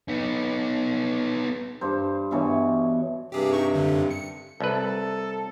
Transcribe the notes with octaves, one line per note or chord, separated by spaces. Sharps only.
B3 D#4
G2 C5
G2 B2 E3 C#5
G2 C3 G4 G#4
D#4 C#6
F#2 D3
C#7
C2 A4 B4